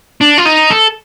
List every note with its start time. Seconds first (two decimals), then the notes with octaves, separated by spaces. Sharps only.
0.21 D4
0.38 F4
0.46 D#4
0.70 A4